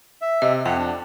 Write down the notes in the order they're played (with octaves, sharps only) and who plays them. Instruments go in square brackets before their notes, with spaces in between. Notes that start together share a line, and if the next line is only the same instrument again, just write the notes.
[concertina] E5
[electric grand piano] C3 [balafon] D#5
[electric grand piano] F2 [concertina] F#5 [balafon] G5
[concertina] D4